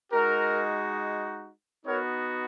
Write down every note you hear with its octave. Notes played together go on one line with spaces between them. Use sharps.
G#3 D#4 F#4 A#4
B3 D#4 F#4 A#4 C#5